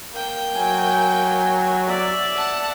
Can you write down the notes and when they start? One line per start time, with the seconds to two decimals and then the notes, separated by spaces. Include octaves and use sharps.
0.12 A#3 G5
0.54 F#3 G#5
1.88 D5 E5
2.36 F#5 A5